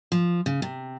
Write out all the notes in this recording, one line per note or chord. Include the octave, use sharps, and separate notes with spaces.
F3
C#3
C3